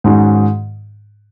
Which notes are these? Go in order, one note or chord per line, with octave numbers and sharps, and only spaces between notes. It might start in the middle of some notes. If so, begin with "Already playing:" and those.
G#2 D#3 G#3 C#4 F#4